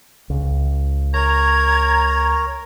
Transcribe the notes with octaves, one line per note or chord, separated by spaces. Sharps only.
C#2
A#4 C#5 A#5 G#6